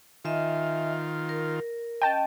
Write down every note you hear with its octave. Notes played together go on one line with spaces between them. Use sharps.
D#3 F4 D#5 E5 G#5
A#4
C#4 D#5 G5 A5